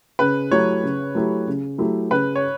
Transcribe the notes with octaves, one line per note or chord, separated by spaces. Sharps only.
C#3 B4
F#3 A3 E4 G4 C#5
C#3
F#3 A3 E4 G4
C#3
F#3 A3 E4 G4
C#3 B4
C#5